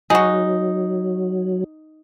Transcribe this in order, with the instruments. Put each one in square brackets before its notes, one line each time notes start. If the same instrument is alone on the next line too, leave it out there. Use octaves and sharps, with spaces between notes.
[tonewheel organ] F#3 [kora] D#4 [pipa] F#4 G#4